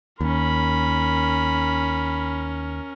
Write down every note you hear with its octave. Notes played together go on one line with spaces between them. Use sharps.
D#2 C#4 A#4 B5